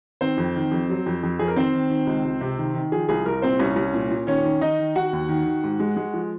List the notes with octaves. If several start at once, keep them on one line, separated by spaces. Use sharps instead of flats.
D#3 C4 C5
F2
D#3
F2
F#3
F2
F2
F2 G#4
A#4
D#3 C4 C5
D#3
D#3
C#2
C#2
C3
D#3
D#3
F3 G#4
C2 G#4
C2 A#4
A#2 C4 C5
C2 C#4 C#5
C2
A#2
A#2
D#3 C#4 C#5
D#3
D#3 D#4 D#5
D#3
D#3 F#4 F#5
D#2
D#3
D#3
G#2
G#3
G#3
F3